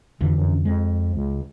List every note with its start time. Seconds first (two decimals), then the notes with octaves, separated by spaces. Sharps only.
0.21 F2 D3 E3
0.35 F#2
0.65 F2 G#3
1.14 C#2